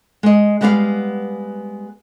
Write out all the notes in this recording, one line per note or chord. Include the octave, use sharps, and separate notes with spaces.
G#3 D#5
G3 G#3 B3 B4 C#5 F5